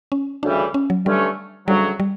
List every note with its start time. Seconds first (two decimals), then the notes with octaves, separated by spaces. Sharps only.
0.12 C#4
0.43 D2 C#3 E3 G3 D4
0.74 C#4
0.90 F#3
1.06 G2 D3 G3 A3 C#4
1.68 D2 C#3 F#3 G3
2.00 G3